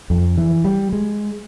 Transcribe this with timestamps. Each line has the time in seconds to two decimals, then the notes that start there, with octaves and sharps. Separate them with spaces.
0.10 F2
0.37 E3
0.65 G3
0.92 G#3